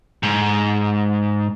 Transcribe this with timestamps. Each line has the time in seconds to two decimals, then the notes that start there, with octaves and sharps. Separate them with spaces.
0.23 G#2